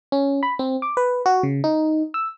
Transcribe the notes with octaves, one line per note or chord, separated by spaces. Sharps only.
C#4
B5
C4
D6
B4
F#4
C#3
D#4
E6